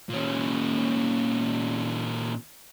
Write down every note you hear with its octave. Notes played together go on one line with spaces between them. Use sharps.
A#2 C#4